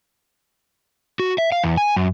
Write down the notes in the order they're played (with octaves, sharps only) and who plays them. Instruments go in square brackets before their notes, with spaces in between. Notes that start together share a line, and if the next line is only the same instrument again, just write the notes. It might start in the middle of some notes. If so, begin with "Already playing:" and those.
[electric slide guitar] F#4
E5
F5
E2
G#5
F#2